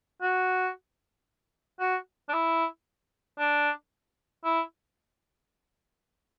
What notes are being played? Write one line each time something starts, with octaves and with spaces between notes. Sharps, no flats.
F#4
F#4
D4
E4
D4
E4